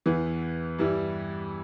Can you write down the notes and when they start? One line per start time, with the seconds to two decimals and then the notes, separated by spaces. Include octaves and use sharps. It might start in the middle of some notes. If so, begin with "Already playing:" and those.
0.06 E2 E3 B3
0.78 G2 E3 G3 E4